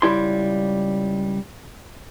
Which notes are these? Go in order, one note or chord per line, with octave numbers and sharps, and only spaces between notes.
C#2 G3 E4 C6